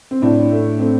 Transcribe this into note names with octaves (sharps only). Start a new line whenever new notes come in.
C4
A2 D4
A3
A3 C4